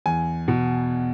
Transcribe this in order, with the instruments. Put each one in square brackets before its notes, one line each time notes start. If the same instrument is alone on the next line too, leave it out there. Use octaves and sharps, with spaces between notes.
[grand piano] E2 G#5
B2